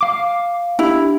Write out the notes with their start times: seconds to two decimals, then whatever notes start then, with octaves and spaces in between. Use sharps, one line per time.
0.01 F5 D6
0.79 D4 E4 G4